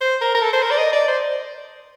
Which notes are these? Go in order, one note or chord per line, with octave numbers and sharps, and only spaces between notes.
C5
A#4
A#4
A4
C5
A#4
D5
D#5
D5
C5